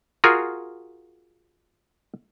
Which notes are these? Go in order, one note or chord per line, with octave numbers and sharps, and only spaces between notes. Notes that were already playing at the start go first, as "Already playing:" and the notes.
F4 F#4 G#4 A#4